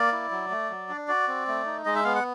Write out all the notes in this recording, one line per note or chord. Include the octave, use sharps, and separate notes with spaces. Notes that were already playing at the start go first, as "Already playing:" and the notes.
Already playing: A#3 D5
E4
F#3
A3
F#3
D4
F#4 D5
C4
A3
D#4
G#3 D#5
E5
B3 F5
F#5